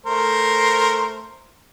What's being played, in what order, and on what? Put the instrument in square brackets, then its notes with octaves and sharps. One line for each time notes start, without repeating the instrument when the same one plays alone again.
[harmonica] A3 A#4 C5